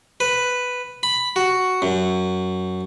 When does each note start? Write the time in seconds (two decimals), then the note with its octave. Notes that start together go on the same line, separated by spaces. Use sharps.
0.20 B4
1.03 B5
1.36 F#4
1.82 F#2